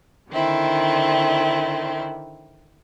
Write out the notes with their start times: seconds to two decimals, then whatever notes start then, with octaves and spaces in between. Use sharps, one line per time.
0.30 D3 D#3 C4 E4